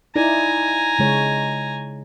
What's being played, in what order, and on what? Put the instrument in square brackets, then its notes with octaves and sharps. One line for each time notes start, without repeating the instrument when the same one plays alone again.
[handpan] D#4 E4 D5 [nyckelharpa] G#5 A#5
[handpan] C#3 G#3 C#5